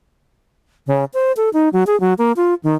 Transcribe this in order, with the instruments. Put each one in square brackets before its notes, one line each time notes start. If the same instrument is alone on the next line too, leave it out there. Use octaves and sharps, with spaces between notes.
[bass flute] C#3
C5
A4
D#4
F#3
G#4
F#3
A#3
F4
D#3